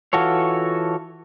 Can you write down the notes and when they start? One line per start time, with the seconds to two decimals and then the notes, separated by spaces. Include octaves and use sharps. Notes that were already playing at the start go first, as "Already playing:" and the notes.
0.13 E3 F4 F#4 A4 C#5